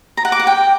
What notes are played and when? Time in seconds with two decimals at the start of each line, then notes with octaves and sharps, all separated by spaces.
0.17 A#5
0.25 F#5
0.32 D6
0.39 F#5
0.47 G5